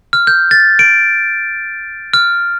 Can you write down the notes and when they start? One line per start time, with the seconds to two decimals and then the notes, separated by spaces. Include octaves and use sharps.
0.13 F6
0.27 G6
0.51 A6
0.79 D7
2.14 F6